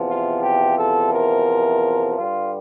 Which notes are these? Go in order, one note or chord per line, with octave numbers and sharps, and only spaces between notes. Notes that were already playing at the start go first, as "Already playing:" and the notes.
Already playing: E2 C3 F3
F4
G4
A4
A#4
G2 D3 G3 F4